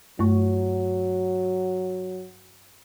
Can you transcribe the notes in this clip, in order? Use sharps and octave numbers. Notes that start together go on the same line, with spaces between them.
G2 F#3 A3 C#6